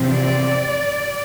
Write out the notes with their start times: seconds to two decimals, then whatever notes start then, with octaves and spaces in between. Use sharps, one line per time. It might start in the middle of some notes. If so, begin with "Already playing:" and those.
Already playing: E2 C3 F3 C4
0.09 D5